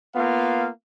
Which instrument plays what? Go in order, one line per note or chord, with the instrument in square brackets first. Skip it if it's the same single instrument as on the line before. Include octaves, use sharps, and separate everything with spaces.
[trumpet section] A#3 B3 F4 F5